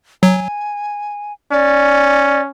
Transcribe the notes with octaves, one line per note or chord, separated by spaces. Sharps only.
F#3 G#5
C#4 D5